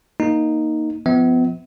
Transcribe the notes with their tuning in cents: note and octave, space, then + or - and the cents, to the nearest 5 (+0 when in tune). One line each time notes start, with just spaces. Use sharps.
A#3 +0 D#4 +0
F3 +0 B3 +30 E5 -35